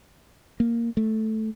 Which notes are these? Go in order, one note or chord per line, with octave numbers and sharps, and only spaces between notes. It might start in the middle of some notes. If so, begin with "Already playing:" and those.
A#3
A3